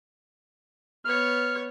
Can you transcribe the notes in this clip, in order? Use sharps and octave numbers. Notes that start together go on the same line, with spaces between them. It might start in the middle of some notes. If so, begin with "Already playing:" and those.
B3 C#5 F6